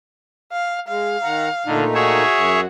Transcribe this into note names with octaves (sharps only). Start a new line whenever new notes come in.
F5
G#3 F5
D#3 F#5 A#5
A#2 D3 A3 D#4
F#4 G#4 C#5 E5
F#2